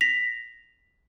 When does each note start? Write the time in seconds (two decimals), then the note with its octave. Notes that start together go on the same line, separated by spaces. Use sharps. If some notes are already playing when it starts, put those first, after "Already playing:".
0.01 A#6 B6 F7